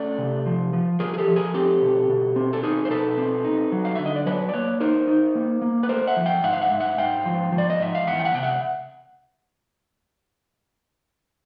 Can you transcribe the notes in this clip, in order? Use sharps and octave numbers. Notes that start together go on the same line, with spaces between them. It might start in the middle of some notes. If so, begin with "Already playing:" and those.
Already playing: A3 C#4 D5
C3
F3
F3
F3 G#4 A#4
G#4
G4 A4
F3
G#4 A#4
C4 G4 A4
B2
B2
C4
A4
D#4 G#4 A#4
C5
B2 A4 B4
C4
D#4
F#3
F5
D3 E5
D#5
D5
F#3 B4 C#5
D5
A#3 B4 C#5
D#4 A#4 C5
D#4
A#3
A#3
B4
A3 A#4 C5
E5 F#5
F3
F5 G5
G#2 E5 F#5
F5
E5 F#5
G#2
E5 F#5
G#2 F5 G5
F3
F3
D5
D#5
G#2 E5
F5
E2 E5 F#5
G5
E5 F#5
C3 G5
E5 F#5